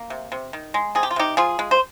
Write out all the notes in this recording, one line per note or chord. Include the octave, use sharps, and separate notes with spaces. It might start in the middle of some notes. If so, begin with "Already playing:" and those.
Already playing: A#3
C3
C3
D#3
G#3
C3 G#4
G4
F4
C3 D#4 G4
F3 F4 G#4
G#3
C5